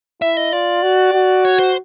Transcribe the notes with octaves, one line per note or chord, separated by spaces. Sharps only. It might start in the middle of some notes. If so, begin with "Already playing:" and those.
E4 E5
D#5
F4 D5
F#4
F#4
C#5
C5